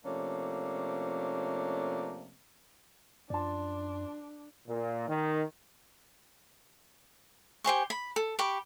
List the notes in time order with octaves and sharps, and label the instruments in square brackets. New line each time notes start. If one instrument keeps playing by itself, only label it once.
[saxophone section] C3 F3 A3 A#3 C#4 D4
[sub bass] F#2 [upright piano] F3 A5 [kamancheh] D4 [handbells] D5 C6
[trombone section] A#2
D#3
[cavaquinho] G4 C5 G#5 C#6
B5
A4
G4 B5 C#6 D6